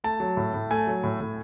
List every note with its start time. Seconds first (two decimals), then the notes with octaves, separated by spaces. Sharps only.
0.04 A3 A5
0.20 F#3
0.37 A2
0.54 A2
0.71 A3 G#5
0.87 F#3
1.04 A2
1.21 A2